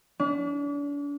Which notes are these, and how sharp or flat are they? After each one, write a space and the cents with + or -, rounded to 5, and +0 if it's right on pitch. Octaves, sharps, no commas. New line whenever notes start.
D4 -40